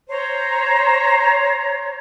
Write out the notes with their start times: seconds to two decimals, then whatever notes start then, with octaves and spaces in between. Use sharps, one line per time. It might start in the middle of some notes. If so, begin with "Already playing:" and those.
0.09 C5 C#5 A#5